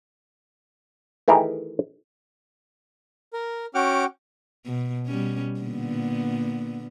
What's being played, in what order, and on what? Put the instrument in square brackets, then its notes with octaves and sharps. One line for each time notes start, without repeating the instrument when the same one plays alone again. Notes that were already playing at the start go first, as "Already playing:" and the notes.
[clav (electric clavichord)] D#3 E3 A3 G4 G#4 A#4
[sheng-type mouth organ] A#4
[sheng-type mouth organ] C#4 D6 F6 [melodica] F#4 F#5 G5
[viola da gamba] B2
B2 G3 C#4
A#2 D3 B3